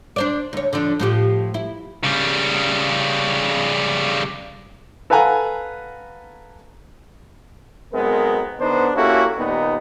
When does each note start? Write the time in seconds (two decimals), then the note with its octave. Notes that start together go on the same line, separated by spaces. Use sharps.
0.16 D4 C5 D5
0.53 D2 C#5
0.73 D3 F3 D4
0.99 A2 F3 G4
1.54 E4
2.04 C#3 G3
5.10 A4 B4 F5 F#5 G#5 A#5
7.93 B1 G#3 B3 C4 A#4
8.60 D3 B3 D4 D#4 B4 C5
8.95 A#3 C#4 E4 F#4 G4 A4
9.37 D#2 A#2 G3 B3 D#4